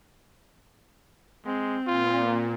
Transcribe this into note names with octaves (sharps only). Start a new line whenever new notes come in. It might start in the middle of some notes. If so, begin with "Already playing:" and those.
G#3 C4
A#2 F4